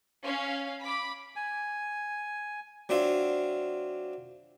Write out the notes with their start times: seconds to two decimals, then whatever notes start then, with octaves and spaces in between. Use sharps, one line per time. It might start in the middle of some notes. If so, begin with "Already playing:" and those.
0.23 C#4 F5
0.83 B5 D6
1.36 G#5
2.89 F#3 C4 D4 F4 E5 F5